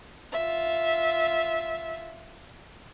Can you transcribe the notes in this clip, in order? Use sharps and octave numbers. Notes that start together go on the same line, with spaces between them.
F4 E5